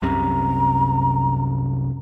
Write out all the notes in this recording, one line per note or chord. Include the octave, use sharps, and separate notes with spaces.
C2 F#2 C3 A#5